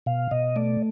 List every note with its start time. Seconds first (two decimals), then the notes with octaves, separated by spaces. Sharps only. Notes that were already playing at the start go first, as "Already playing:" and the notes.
0.06 B2 F5
0.31 B2 D#5
0.56 A3 D5